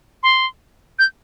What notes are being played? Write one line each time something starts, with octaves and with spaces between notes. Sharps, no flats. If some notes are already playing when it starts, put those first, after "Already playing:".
C6
G6